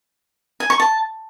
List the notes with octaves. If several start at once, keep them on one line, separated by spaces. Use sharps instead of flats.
G#5
C#6
A5